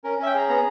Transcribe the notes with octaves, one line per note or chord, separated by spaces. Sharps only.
C#4 A#4
C#4 E5
G5
G#4 A#5
B3 A#5